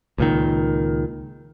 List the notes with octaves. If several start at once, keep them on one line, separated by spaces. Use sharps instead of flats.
C#2 A#2 D#3